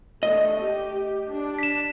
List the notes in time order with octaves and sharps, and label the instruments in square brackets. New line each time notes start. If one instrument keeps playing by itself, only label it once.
[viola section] A3 D4 [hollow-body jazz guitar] D#5
[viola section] G4
D4
[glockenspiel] B6 E7